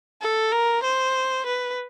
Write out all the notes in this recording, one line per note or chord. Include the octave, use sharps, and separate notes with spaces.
A4
A#4
C5
B4